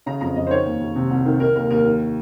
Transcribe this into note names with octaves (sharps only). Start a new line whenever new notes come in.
C#3 A#5
F2 A#5
F2 D#5
C5
D#3 C#5
D#2
D#2
C3
C2
D#3
D#3 A#4
D#2 A#4
D#2 A#4
D#3